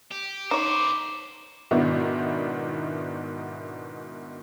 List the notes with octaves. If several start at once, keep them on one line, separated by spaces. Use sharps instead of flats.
G4
B3 D#4 C5 C#5 D6
G#2 B2 D#3 B3 D4 E4